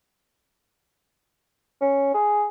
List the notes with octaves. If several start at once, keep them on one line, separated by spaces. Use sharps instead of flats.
C#4
G#4